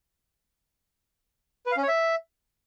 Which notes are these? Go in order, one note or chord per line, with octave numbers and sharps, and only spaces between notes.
B4
F5
C#4
C#5
E5